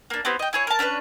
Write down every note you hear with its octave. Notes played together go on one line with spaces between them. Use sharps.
A#3 D4
B3 C4 E4 G4
D#5 G5
E4 G#4 C#5
A#4 A5
C#4 D4 A#4 B4